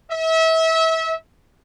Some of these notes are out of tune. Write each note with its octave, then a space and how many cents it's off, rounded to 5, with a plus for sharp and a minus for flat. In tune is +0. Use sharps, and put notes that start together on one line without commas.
E5 -30